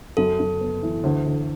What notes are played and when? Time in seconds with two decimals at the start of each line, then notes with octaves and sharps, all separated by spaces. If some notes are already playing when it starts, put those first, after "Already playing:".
0.17 F#2 A4
0.39 F#2
0.61 B3
0.82 E3
1.03 D2
1.25 D2